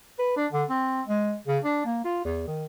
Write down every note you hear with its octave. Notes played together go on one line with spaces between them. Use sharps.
B4
D4
D3
C4
G#3
C#3
D4
A#3
F4
E2
D#3